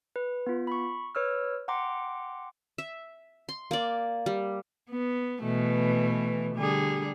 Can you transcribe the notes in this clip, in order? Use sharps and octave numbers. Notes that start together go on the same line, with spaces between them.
B4
B3 F4
B5 C#6
B4 C#5 E6 F6
F#5 G5 A#5 C6 D6
E5
C6
A#3 D5
G3
B3
B2 E3 A3
D3 G3 G#4